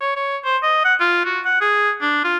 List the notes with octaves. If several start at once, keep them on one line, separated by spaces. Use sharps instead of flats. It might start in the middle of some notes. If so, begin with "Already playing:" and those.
C#5
C#5
C5
D#5
F#5
F4
F#4
F#5
G#4
D4
F4